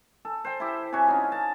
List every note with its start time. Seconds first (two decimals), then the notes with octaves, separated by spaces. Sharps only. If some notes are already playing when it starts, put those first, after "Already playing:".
0.25 A4
0.45 C5 G5
0.60 E4 G4
0.92 C3 F#4 C#5 G#5
1.07 C#4 D#4 F4
1.32 A5